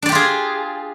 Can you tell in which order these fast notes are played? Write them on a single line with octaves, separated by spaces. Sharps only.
D4 D5 G4 F4 G#4